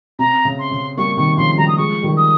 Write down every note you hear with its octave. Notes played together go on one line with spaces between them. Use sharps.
C3 A#5
C#3
C6
C#3
G3 A#3 C#6
C3 D#3 C#6
C#3 F3 C6
D#3 G3 A#5
D#6
F3 G#3 C#6
D#3 G3
D#6